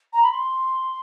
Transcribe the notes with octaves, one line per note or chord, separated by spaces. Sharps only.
A#5
B5
C6